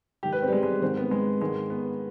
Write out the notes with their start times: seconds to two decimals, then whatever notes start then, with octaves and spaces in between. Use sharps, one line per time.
0.23 G#2 D#3 G4
0.32 B4
0.43 C4
0.48 G3
0.53 G#3
0.63 G#3
0.81 G#2 D#3 C4
0.97 B3
1.11 G#3
1.41 G#2 D#3 G#3
1.70 B3